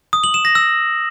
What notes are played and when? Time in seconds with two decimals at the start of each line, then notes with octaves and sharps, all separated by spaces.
0.13 D#6
0.24 F#7
0.34 E7
0.45 A#6
0.55 E6